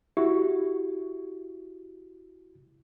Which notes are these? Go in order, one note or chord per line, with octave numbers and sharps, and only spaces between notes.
E4 F#4 G4